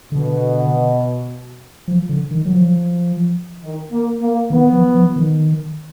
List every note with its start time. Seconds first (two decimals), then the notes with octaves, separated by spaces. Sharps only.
0.12 B2 D3
1.88 F3
2.09 D3
2.31 D#3
2.45 F#3
2.53 F3
3.63 D#3
3.92 A#3
4.21 A#3
4.50 D#3 B3
4.72 F3
4.95 F3
5.16 D#3